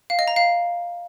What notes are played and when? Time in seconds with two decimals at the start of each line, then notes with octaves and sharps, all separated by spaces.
0.10 F5
0.19 D#5
0.28 A#5
0.36 F5